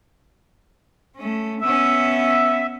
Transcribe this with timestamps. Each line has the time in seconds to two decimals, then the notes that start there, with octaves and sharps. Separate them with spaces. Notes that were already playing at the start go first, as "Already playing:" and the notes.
1.16 A3 C#4
1.61 B3 C#4 E5